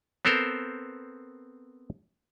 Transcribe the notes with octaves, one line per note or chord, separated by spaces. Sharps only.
B3 C4 A4 A#4 C5